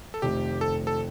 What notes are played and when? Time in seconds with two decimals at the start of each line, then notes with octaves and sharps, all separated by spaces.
0.14 A4
0.22 F1 F2 D#3 A3 C4 G4
0.61 A4
0.87 A4